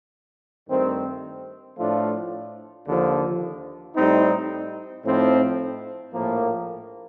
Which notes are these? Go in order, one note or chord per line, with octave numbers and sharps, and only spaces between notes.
G2 D#3 A3 C4
A2 F3 A3 D4 F4
D#2 D3 F3
A2 G3 C4 D#4
A2 F3 C4 D#4
A#1 A2 F3 A#3